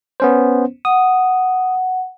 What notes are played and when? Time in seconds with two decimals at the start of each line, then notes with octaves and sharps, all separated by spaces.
0.20 B3 C#4 C5
0.85 F#5 D#6